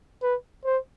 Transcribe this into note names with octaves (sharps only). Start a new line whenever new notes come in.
B4
C5